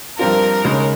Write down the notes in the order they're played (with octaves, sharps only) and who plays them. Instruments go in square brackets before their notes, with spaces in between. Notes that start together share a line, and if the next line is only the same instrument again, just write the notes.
[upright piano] G2 F3 C4 F4 [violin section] A#4
[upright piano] D#2 C#3 G#3